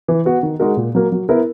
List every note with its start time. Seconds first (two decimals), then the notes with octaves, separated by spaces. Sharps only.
0.08 E3
0.25 B3 F#4
0.43 D#3
0.60 G#3 D#4 F#4 A#4
0.77 A#2
0.95 F#3 A#3
1.12 F#3
1.29 B3 E4 A#4